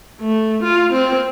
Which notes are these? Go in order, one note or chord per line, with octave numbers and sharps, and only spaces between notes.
A3
F4
C4